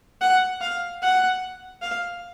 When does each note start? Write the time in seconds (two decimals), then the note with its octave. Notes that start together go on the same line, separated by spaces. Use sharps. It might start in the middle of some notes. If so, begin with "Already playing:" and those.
0.21 F#5
0.61 F5
1.02 F#5
1.82 F5